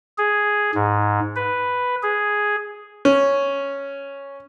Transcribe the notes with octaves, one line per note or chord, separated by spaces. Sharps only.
G#4
G#2
B4
G#4
C#4